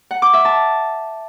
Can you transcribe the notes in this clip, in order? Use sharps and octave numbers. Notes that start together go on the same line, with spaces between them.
F#5
D6
E5
A5